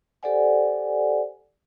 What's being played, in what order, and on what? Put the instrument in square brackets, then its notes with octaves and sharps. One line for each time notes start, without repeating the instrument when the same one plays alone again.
[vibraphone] G4 A4 C5 D5 F#5 G#5